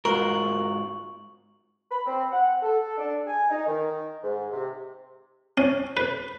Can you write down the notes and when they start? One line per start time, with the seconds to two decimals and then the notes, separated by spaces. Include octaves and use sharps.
0.05 G#2 F4 F#4 A#4 C#6 F#7
1.91 B5
2.06 C4
2.32 F#5
2.63 A4
2.98 D4
3.27 G#5
3.50 D#4
3.66 D#3
4.23 G#2
4.52 C3
5.58 C#4
5.97 B4